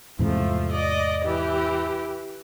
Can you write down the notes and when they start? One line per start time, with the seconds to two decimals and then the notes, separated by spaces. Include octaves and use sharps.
0.19 E2 G#2 C3 F3 A3
0.71 D5 D#5
1.24 E3 G4